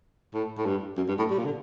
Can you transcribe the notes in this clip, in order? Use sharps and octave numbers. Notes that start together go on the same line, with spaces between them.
A2
A2
G2
F#2
G2
A2
G3
A#2
D3